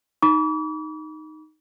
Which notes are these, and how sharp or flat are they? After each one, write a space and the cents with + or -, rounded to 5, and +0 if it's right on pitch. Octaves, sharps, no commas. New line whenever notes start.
D#4 +0 B5 -35 D6 -40